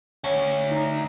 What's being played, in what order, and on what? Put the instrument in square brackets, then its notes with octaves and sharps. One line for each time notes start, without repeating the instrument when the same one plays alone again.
[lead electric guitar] D2 [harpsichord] C#4
[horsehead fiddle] D#4